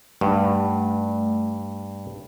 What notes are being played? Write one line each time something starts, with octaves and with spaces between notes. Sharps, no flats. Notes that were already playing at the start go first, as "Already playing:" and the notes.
G2 A3